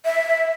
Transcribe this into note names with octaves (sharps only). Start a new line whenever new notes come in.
E5